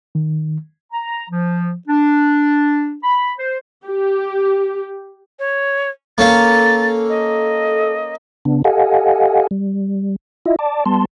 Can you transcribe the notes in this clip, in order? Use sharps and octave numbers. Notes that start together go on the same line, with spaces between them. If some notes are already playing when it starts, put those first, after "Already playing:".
D#3
A#5
F3
D4
B5
C5
G4
C#5
A#3 C#4 A4 F5 A6
D#5
C#3 B3 D4
G4 A4 D#5 F5 F#5 G#5
G3
E4 F4 D#5 E5
D5 A5 D6
G3 B3 A5 C6